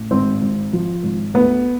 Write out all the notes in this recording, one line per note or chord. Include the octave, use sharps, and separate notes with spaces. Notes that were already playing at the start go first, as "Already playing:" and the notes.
Already playing: A1
G#1 C4
G#1
F3
G#1
D2 B3